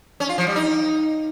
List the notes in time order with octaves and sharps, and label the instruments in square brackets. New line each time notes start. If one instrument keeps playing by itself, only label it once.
[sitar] C#4
F4
F3
G3
D#4